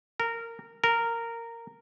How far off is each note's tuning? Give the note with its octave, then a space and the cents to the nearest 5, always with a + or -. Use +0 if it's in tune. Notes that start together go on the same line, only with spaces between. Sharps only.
A#4 -15
A#4 -10